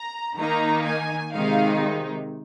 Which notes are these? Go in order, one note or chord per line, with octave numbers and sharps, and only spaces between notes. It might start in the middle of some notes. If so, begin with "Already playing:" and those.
Already playing: A#5
D#3 A#3 D#4 A#5
G#5
C3 D#3 G#3 D#4 F5